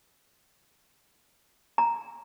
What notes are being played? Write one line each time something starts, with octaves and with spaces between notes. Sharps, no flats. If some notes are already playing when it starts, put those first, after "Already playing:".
A#5